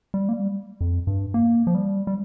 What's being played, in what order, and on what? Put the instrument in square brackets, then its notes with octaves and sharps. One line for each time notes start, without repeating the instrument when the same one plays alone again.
[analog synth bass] G3
A#3
G3
F2
G2
A#3
F3
G3
G3